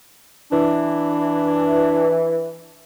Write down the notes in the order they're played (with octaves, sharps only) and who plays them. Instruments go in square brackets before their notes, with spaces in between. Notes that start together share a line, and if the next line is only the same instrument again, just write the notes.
[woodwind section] E3 [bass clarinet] D4